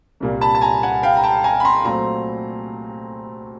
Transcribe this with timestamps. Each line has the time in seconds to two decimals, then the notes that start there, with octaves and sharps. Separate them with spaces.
0.20 C2 A#2 G3 A#3
0.41 A5 B5
0.55 A5
0.61 G#5 A#5
0.83 F#5 G#5
1.03 F5 G5
1.17 A#5
1.23 G5 A5
1.44 G#5 A#5
1.60 B5
1.65 A#5 C6
1.85 A#2 F#3 A3 C4 A#5 C6